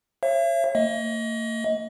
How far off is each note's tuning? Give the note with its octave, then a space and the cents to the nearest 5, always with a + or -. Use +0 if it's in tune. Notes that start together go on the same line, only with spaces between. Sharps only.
C#5 -35 E5 +40
A#3 -45 D#5 +25